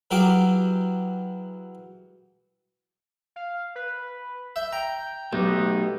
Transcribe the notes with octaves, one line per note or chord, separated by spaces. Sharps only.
E3 F#3 G4 G#4 F5 D6
F5
B4
E5 G6
G5 A#5
B1 A3 B3 D#4 G4